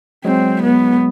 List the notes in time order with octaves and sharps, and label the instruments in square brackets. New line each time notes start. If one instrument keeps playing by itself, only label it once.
[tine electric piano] F#3 G#3 [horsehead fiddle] C4
[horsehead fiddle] B3